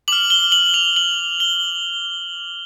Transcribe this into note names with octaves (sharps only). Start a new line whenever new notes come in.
D6 F6 F#7
G7
F#7
F7
F#7
G7